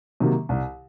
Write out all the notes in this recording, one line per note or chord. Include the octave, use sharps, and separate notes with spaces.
C3 D#3 F#3 A#3
C2